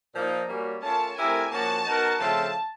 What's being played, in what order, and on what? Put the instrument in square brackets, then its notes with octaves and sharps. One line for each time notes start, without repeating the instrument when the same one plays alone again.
[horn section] A#2 F3 A#3 D#4
G3 A#3 C#4 F#4
[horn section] A3 C#4 F4 A#4 C#5 [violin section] A5
[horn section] A3 C4 E4 G4 A#4 [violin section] G#5
[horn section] F3 A#3 C#4 F#4 [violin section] A5
[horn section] B3 D#4 F#4 A#4
[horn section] C#3 F3 A3 C4 F4 [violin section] A5